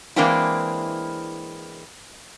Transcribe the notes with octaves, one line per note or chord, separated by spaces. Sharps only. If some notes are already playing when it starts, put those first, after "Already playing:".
E3 G#3 A#3 C4 D4 E4